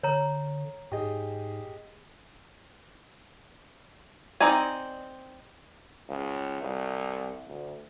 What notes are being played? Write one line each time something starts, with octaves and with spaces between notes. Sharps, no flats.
D3 C#5 A#5
G#2 G4 G#4 D#5
C4 D#4 D5 D#5 G#5
C#2
C2
D2